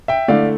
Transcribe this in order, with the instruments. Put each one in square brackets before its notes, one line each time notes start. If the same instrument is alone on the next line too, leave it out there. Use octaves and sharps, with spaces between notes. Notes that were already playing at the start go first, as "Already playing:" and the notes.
[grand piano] E5 G5
[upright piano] D3 A3 E4 [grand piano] D5 F5